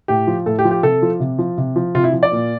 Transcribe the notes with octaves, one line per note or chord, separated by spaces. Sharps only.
A2 G4
F3
A2 A4
G4
F3
G4
C3 A4
F3
C3
F3
C3
F3
C3 F4
E4
F3
D5
A#2